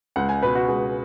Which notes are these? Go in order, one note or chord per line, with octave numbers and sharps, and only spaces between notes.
C#2 F#5
G#5
B2 B4
F#4
C#2 G#4